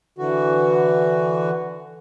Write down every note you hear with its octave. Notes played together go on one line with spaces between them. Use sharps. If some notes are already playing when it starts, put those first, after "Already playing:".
D3 E3 F#4